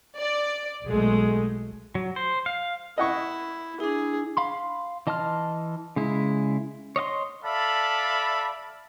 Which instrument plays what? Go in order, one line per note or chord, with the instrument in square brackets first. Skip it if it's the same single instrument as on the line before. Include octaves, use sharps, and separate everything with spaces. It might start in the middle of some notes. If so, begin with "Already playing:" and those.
[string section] D5
B1 G#3 A3
[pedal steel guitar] F#3
C5
F5
[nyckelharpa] E4 [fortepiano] D#5 F#5 C#6
[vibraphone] D4 E4 [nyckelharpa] G#4
[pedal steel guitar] F5 B5 C6
E3 D#5 A5 C6 F6
C#3 G#3 E4
C#5 D#5 F5 C6
[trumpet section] A4 D5 E5 F5 A5 B5